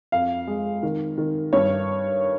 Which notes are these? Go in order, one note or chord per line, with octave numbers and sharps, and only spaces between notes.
F2 F5
G#3
D#3
D#3
G2 C#5